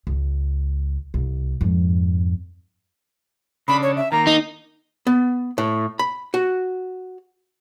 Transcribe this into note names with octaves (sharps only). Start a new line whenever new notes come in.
C#2
C2
F2 G#2
C#3 D4 B5
C#5
E5
D#3 A#3 A#5
D#4
B3
A2
B5
F#4